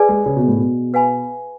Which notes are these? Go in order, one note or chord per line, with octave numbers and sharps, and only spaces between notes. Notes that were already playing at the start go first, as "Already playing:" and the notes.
Already playing: G#4 B4 D5 G#5
G#3
C#3
B2
A2
B2
B4 F5 G#5 B5